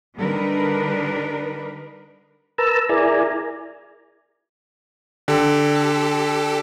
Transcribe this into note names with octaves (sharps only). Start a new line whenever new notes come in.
D3 G3 D4 D#4 A#4 B4
A#4 B4 A5 A#5 E6
E4 G#4 A#4 D5 G#5 A#5
D3 G4 A4